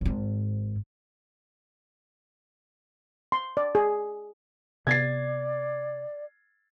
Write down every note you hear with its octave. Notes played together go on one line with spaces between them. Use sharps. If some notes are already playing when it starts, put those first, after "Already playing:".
G#1 G#2
C6
D5
G#4
C3 B3 D5 G#6 A6 C7